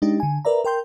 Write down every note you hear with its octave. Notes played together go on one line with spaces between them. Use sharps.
G#3 D4 D#4 G4
D3 G#5
A#4 B4 D5 E5 A#5
A#4 G5 C6 G6